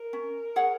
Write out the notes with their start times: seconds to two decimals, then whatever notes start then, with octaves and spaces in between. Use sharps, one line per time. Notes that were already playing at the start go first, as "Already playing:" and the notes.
Already playing: A#4
0.13 C#4
0.56 G#4 C#5 F#5